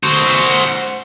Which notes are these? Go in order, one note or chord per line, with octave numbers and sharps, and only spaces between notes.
F#4 C5